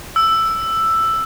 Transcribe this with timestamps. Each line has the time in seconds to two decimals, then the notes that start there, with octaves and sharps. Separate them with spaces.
0.16 E6